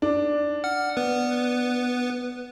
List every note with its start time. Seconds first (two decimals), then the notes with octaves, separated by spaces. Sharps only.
0.02 D4
0.64 F#5 F6
0.97 B3 B4